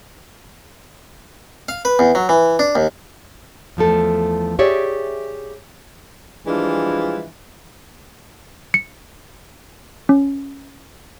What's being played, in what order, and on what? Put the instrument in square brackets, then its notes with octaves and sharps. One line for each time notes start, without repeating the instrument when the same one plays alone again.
[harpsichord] F5
B4
E2
F#3
E3
D4
D#2
[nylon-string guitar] E2 F3 A3 A4
G4 G#4 C#5 D5 E5
[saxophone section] E3 F3 G3 G#3 D4 F4
[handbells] C#7
C#4